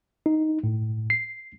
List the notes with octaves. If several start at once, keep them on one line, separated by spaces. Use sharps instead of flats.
D#4
A2
C7